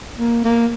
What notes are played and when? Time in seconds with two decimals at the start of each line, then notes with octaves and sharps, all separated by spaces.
0.19 A#3
0.44 A#3